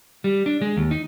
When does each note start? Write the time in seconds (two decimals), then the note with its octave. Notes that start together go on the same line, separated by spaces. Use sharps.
0.24 G3
0.46 D4
0.62 G#3
0.77 D#2
0.91 D#4